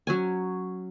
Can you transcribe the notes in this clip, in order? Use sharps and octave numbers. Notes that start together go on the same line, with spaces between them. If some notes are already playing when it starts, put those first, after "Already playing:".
F#3 C#4 G#5